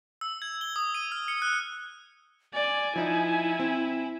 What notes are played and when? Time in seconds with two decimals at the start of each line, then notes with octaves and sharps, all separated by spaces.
0.21 E6
0.42 G#6
0.61 G7
0.76 D#6
0.95 D#7
1.12 F6
1.28 C#7
1.42 F#6
2.54 D5 G#5
2.96 F3 D#4 E4
3.60 C4